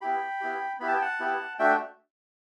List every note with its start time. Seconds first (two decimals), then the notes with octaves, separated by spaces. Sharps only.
0.01 B3 E4 G4 G5 B5
0.41 B3 E4 G4
0.80 B3 E4 G4 B5
0.88 A5
0.94 G5
1.02 F#5 A5
1.20 B3 E4 G4
1.59 A3 D4 F#4 E5 G5